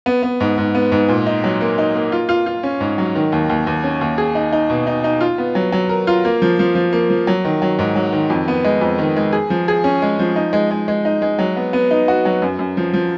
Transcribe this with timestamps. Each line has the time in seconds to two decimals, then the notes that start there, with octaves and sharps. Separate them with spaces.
0.06 B3
0.23 B3
0.40 G#2
0.58 G#2
0.75 B3
0.92 G#2
1.09 A#2
1.26 D#4
1.44 F#3
1.61 A#3
1.78 D#4
1.95 A#3
2.12 F4
2.29 F4
2.46 F4
2.63 C#4
2.80 G#2
2.98 F#3
3.15 D#3
3.32 D#2
3.50 D#2
3.67 D#2
3.84 C#4
4.01 D#2
4.18 G#4
4.35 D#4
4.53 D#4
4.70 B2
4.87 D#4
5.04 D#4
5.21 F4
5.38 B3
5.55 F#3
5.72 F#3
5.89 A#4
6.07 F4
6.25 A#3
6.42 F3
6.59 F3
6.75 F3
6.93 A#3
7.10 F3
7.27 F#3
7.45 D#3
7.62 F#3
7.79 G#2
7.96 F#3
8.13 D#3
8.30 F2
8.48 B3
8.64 G#3
8.81 F2
8.99 D#3
9.16 G#3
9.33 G#4
9.50 F3
9.68 G#4
9.84 C#4
10.02 G#3
10.19 F3
10.36 D#4
10.53 G#3
10.71 G#3
10.88 G#3
11.05 D#4
11.22 G#3
11.39 F#3
11.56 B3
11.73 B3
11.91 D#4
12.08 F#4
12.25 F#3
12.42 F#2
12.59 F#2
12.77 F3
12.93 F3